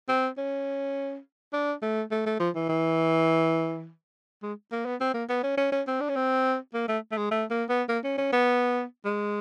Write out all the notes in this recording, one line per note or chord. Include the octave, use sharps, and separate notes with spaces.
C4
C#4
D4
A3
A3
A3
F3
E3
E3
G#3
A#3
B3
C4
A#3
B3
C#4
C#4
C#4
C4
D4
C#4
C4
A#3
A3
A3
G#3
A3
A#3
B3
A#3
C#4
C#4
B3
G#3